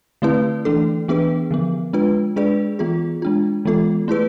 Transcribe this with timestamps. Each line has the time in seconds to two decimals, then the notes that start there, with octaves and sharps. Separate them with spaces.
0.22 D3 A3 C4 E4 B4
0.65 E3 A3 D4 A4
1.08 E3 B3 D4 G#4 B4
1.51 D3 F3 B3
1.93 G#3 D4 F4 B4
2.36 G#3 D4 G#4 B4 D5
2.79 E3 B3 F4 G#4
3.22 G#3 D4 F4
3.65 E3 G#3 B3 F4 A4
4.08 A3 E4 G#4 B4